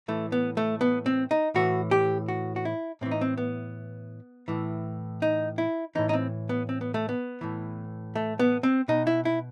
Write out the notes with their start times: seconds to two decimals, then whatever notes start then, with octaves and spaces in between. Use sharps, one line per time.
0.08 A2 E3 A3
0.32 B3
0.57 A3
0.81 B3
1.06 C4
1.31 D#4
1.55 A2 E3 F#4
1.91 G4
2.28 F#4
2.56 F#4
2.65 E4
3.01 A2 E3 C4
3.11 D#4
3.21 C4
3.37 B3
4.48 A2 E3
5.22 D#4
5.58 E4
5.95 A2 E3 D#4
6.09 D#4
6.13 C4
6.49 B3
6.69 C4
6.81 B3
6.94 A3
7.09 B3
7.41 A2 E3
8.15 A3
8.39 B3
8.63 C4
8.88 B2 D#4
9.07 E4
9.25 E4